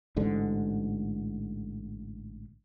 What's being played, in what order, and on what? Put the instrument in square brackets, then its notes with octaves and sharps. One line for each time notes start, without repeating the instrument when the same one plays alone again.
[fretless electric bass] A1 G#2 D3